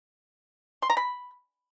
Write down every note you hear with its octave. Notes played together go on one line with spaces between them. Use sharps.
C6
A#5
B5